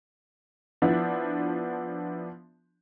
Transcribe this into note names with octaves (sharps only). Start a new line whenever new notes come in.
F3 B3 D4 E4